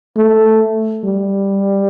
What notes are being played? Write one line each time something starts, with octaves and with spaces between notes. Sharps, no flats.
A3
G3